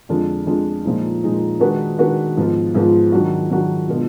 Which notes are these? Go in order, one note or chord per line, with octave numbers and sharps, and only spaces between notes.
F2 D3 G#3 D4 F4
F2 D3 G#3 D4 F4
A#2 F3 G#3 D#4
A#2 F3 G#3 D#4
D#3 G#3 D4 F#4 B4
D#3 G#3 D4 F#4 B4
G#2 F3 B3 F4
G#2 F3 B3 F4
D#3 F#3 D4 F#4
D#3 F#3 D4 F#4
B2 G#3 B3 D4 F4